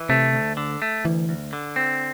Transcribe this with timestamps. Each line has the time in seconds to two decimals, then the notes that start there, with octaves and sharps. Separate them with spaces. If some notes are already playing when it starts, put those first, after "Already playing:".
Already playing: E3
0.09 C3 A3
0.33 D2
0.57 D3
0.82 A3
1.04 D2 E3
1.29 D2
1.53 D3
1.76 C4